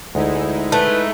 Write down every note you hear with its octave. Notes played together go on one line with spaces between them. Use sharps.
D2 G#3 D#4 E4
A3 B4